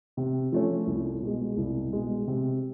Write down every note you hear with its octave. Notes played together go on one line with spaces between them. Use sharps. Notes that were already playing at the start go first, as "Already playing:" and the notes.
C3
F3 A3 C#4
C2
B2 G#3
C2
B2 G#3
C3